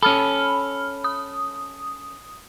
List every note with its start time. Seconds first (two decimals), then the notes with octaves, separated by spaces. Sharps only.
0.03 C#4 A4 B5 F6
1.04 D#6